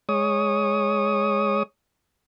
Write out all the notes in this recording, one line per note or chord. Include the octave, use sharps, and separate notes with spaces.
G#3 C#5 D#6